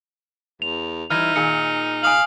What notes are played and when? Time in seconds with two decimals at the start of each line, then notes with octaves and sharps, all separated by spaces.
0.62 E2 F7
1.10 E3 G3 D#4 F6
1.36 A#2 D#3 G#4 C#7
2.03 F5 G#5 D#6 F#7